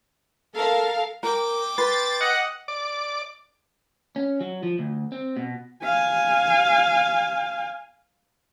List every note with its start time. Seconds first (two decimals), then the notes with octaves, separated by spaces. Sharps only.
0.55 A4 A#4 F5
1.23 A#4 G5 D6
1.78 B4 C6 A6
2.21 D#5 F#5
2.68 D5 D6
4.16 C#4
4.41 F#3
4.63 F3
4.79 D2
5.12 C4
5.37 B2
5.84 F5 G#5